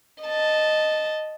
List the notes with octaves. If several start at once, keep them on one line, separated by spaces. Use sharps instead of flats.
D#5 A5